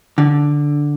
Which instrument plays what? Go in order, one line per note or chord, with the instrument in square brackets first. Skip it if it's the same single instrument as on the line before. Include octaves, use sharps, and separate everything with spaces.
[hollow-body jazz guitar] D3